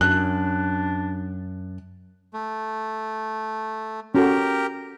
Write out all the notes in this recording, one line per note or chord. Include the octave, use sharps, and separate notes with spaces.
F#2 D4 F#6
A3
C#4 F#4 G4 A4 A#4